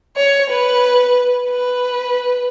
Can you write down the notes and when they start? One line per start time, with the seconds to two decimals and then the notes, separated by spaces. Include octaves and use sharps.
0.17 C#5
0.50 B4
1.50 B4